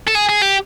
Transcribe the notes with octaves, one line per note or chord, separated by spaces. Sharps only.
A4
G#4
G#4
G4